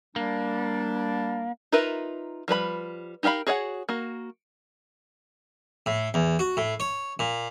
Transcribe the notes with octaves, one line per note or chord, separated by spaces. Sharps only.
G3 A#3 D4
D#4 F4 A#4 B4 E5
F3 G3 B4 B5
D#4 G4 A#4 F5 B5
F#4 G#4 C#5 F5 F#5
A#3 F#4
A2
E2
F#4
A2
C#5
A#2